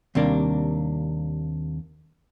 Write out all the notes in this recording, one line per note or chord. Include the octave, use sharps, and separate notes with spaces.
D#2 C3 G3 A#3 D4